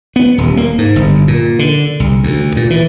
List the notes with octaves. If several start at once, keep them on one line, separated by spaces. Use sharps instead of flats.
B3
D#1
A#3
G#2
G1
A#2
D3
C2
D2
A#2
E3